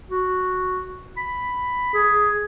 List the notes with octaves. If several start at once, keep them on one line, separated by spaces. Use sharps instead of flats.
F#4
B5
G#4